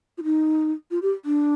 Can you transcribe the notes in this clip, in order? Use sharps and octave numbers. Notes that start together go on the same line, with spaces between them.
F4
D#4
F4
G4
D4